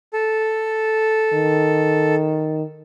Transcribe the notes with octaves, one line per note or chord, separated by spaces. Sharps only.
A4
D#3